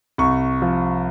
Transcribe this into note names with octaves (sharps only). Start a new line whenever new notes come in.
C2 C#6
F3